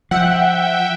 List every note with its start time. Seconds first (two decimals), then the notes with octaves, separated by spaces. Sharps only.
0.11 F3 E5 F#5 G5